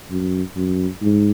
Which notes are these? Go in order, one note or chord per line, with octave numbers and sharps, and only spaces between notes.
F#2
F#2
G#2